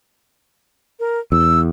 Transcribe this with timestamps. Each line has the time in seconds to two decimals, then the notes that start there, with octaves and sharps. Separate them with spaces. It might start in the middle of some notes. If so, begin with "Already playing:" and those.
1.00 A#4
1.32 E2 E6